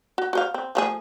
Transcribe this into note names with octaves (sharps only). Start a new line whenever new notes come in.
F#4
F#4 C5 F5
C4
F3 A3 G#4